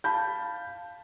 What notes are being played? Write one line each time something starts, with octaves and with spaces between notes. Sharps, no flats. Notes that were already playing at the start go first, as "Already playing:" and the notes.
F5 A5 B5 G6